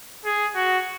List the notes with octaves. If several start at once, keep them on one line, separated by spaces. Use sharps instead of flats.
G#4
F#4